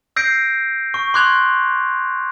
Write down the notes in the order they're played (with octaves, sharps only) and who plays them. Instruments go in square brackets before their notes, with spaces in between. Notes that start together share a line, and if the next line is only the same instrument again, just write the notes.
[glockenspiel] E6 G6 A#6 C7 D7
C#6
C6 D6 F#6 G#6 F7